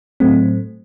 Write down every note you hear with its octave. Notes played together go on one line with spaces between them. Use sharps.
A2 F#3 A3 C4